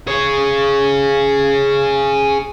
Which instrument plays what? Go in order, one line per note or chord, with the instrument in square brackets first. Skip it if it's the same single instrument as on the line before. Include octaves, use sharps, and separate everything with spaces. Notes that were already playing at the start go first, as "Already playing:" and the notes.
[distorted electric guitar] G#4 C#5